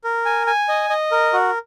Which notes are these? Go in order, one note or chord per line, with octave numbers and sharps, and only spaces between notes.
A#4
G#5
G#5
D#5
D#5
A#4
F#4